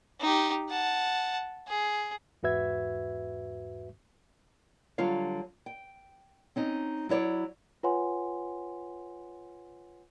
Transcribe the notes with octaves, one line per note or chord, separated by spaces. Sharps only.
D#4 G4
F#5 A5
G#4
E2 G#2 F#4 B4 E5 G#6
D3 F#3 G3 F4 C#5 F5
G5
C4 C#4 D#4
F#3 E4 C#5 D5
F4 B4 C#5 F#5 G#5 C6